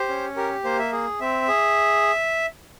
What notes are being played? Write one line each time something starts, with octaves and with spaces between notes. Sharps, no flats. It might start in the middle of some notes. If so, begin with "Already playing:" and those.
Already playing: G4 C5
C#4
G4 A#4
A#3 C5
E5
G#4
C4 E5
G#4